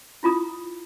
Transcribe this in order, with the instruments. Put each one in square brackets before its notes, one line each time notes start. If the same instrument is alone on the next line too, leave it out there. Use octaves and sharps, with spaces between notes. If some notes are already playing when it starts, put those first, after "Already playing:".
[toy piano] E4 F4 A#5 D#6